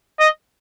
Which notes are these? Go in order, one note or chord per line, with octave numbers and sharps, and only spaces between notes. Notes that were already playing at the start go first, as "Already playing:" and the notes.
D#5